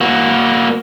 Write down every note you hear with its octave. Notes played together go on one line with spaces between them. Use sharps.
A#3 F#4